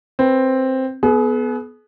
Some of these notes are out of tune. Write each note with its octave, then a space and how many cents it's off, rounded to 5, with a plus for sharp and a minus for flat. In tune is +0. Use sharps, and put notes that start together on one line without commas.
C4 +5 B4 +0
B3 +0 G#4 +40